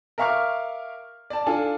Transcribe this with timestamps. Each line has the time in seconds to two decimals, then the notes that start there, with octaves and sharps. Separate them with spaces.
0.18 A#4 E5 F5 C#6 D6 F6
1.30 D5 A5
1.46 D4 F4 A4 G#5